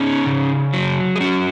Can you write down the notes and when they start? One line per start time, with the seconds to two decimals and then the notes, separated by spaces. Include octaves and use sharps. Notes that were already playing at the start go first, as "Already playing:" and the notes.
Already playing: C#4 D#4 G#4
0.26 C#3
0.73 F#3
1.16 G#4
1.21 C#4 F#4